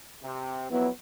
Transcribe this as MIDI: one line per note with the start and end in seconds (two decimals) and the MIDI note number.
0.23 0.67 48
0.71 0.88 41
0.71 0.88 54
0.71 0.88 59
0.71 0.88 64